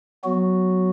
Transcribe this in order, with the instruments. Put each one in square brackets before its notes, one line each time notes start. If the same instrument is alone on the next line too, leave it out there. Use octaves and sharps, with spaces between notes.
[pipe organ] F#3 B3 F#4